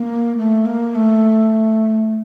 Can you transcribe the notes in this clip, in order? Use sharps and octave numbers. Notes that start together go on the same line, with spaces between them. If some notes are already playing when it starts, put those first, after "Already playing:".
Already playing: A#3
A3
A#3
A3